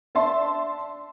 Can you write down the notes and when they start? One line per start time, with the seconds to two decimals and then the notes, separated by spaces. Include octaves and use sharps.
0.15 D4 E5 A5 C6